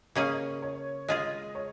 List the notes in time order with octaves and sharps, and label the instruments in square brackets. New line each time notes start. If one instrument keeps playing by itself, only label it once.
[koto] C#3 A#3 C#4 G#4 [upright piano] D#5
[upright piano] C#5
[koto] G#3 F4 G#4 [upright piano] D#5
[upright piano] C#5